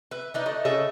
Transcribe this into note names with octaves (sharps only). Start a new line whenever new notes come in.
B4 E5
D4 D#4 B4
A3 D#5
C#3 A4 D#5 E5